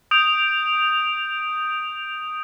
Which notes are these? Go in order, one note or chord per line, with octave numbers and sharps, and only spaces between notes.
D#6 G6 D7 F7